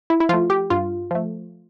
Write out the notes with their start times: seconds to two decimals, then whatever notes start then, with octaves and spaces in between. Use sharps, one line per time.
0.10 E4
0.20 E4
0.29 F3 A3 F4
0.50 G4
0.70 G2 F4
1.11 F3 A3